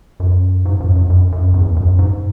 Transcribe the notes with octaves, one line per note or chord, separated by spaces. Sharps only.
F#2
G#2
F#2
F#2
F#2
F#2
E2
F#2
G#2